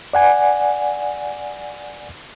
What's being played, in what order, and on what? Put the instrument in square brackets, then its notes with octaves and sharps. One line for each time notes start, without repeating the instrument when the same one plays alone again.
[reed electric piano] D5 F#5 G#5